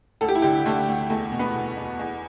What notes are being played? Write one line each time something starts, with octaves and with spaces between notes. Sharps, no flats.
D2 A4
G4
E4
D3 G4
D3 A3
D2
E2 A3
B2
B3
B2
E2
E2